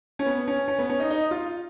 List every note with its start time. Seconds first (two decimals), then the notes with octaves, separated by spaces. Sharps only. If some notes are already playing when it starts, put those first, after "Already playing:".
0.19 C#4
0.26 B3
0.48 C#4
0.68 C#4
0.79 B3
0.89 C#4
1.00 D#4
1.10 D#4
1.31 F4